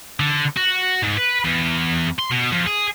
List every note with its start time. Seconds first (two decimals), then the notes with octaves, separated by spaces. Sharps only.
0.20 D3
0.57 F#4
1.02 G#2
1.17 B4
1.45 E2
2.19 C6
2.31 B2
2.52 F2
2.66 G#4